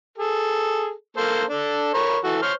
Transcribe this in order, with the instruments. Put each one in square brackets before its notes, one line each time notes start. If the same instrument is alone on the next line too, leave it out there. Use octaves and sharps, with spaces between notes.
[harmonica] G#4 A4
A#3 A4 C5
D4 A4
A#4 C#5 B5
E3 F#4 A4
C5 C#5 F6